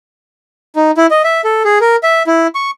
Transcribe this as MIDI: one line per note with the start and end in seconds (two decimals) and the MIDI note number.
0.76 0.91 63
0.97 1.07 64
1.11 1.22 75
1.24 1.41 76
1.44 1.63 69
1.65 1.79 68
1.81 1.96 70
2.03 2.23 76
2.27 2.47 64
2.55 2.71 85